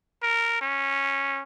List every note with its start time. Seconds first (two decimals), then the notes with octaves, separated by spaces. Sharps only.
0.23 A#4
0.61 C#4